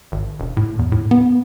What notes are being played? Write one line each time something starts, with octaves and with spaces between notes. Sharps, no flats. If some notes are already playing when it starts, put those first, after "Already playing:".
G#1
E1
A2
E2
A2
B3